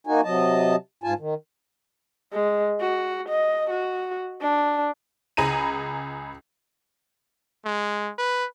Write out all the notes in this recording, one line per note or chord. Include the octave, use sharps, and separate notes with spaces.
A#3 D#4 F#4 G#5
C3 F#3 D#5 A5
G#2 F4 G#5 A5
D#3
G#3
F#4
D#5
F#4
D4
C#2 G#4 A#5 B5 D#7
G#3
B4